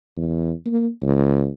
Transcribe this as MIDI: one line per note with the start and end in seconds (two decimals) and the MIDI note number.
0.17 0.52 40
0.66 0.88 58
1.02 1.50 37